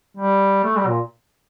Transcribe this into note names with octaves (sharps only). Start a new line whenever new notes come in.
G3
A3
G3
A#2